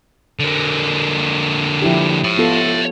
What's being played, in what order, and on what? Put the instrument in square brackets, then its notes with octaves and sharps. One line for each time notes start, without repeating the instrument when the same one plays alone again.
[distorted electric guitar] D3 A#3
[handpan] F3 E4 G4
[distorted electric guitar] C#5 E5
[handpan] B3 F4 A4